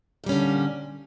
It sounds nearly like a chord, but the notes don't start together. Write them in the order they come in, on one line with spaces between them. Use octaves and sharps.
A#2 G3 C#4 D3